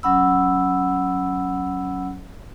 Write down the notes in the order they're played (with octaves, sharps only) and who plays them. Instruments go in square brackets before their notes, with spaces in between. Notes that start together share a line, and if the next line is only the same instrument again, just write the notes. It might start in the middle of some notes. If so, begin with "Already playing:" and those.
[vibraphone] F#3 C#4 F#5 B5 E6